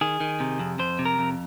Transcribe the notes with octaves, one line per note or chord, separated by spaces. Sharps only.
D#3 G#4
D#3
C3
F2
F2 C5
C3
A#4
F2